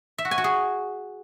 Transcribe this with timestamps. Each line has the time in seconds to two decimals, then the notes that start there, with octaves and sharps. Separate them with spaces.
0.18 E5
0.25 F#4
0.31 G#5
0.38 F#4
0.44 G#4